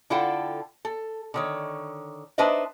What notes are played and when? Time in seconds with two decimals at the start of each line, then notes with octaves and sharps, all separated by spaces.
0.10 D3 E4 F4 A4 F#5 G5
0.85 A4
1.34 D3 D#3 C#5
2.38 D4 D#4 B4 C5 D#5 E5